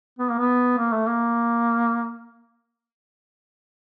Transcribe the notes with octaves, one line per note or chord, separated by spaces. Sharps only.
B3
A#3
B3
A#3
A3
A#3